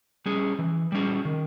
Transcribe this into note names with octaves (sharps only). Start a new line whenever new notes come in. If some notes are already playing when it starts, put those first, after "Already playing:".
G3 C#4 G#4
E3
G3 C#4 G#4
D#3